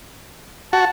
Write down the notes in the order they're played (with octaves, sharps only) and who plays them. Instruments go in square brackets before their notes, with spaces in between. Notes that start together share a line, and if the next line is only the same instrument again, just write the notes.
[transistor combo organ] F#4 [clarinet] A5